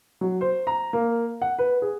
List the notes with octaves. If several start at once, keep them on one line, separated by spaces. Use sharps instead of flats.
F#3
C5
A#5
A#3
F#5
B4
G#4